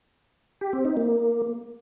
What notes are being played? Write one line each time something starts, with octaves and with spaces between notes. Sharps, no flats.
G4
C4
D#4
A#3